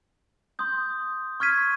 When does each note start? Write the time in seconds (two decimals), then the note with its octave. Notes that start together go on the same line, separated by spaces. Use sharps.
0.59 C6 D#6 G6
1.40 C#6 F6 G#6 B6 D#7